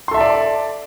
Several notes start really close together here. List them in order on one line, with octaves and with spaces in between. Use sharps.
C6 A4 E5 A5 D5